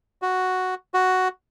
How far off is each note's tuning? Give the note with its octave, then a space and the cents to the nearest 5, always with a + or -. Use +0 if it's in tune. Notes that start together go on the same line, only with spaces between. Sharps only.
F#4 +0
F#4 +5